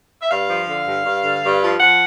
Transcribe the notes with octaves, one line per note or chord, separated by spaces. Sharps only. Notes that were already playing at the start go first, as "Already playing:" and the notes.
E5
G2 F5
F3
D3
G2
G2
D3
G2
F3
F3 F#5